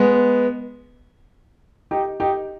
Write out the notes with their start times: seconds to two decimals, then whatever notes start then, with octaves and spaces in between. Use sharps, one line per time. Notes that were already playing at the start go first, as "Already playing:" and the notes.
Already playing: G#3 B3
1.91 D#4 G4
2.20 D#4 G4